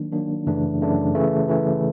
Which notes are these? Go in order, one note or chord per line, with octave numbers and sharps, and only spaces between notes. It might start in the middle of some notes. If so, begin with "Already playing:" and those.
Already playing: D#3 F#3 A#3 D4
D#3 F#3 A#3 D4
F#2 C#3 E3 A3 D4
F#2 C#3 E3 A3 D4
C#3 E3 A3
C#3 E3 A3